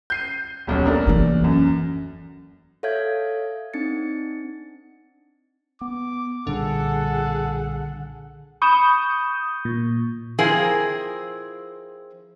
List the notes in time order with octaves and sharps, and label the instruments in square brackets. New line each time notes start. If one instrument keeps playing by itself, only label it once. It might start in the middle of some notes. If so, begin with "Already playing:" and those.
[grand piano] G6 C7 D#7
D#1 B1 C#4
A3 D4 A#4
[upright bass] E3 A#3
[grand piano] F#2
[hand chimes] A4 C#5 E5 F5 G6 G#6
C4 D4 D#4 A6 C#7
[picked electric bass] B3 [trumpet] D6
[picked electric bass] B1 A#2 G3 [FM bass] D3 [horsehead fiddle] G#4 F#5 [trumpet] A4
[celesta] B5 E7 [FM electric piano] C#6 D#6 G6
[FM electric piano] A#2
[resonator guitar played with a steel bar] F3 C4 E4 G#4 A#4